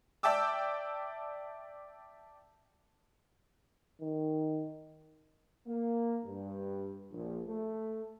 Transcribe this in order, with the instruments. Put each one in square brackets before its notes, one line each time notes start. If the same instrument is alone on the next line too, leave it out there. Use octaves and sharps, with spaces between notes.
[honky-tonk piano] D5 E5 G5 A5 D6 E6
[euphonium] D#3
[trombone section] A#3
G2
A#1
A3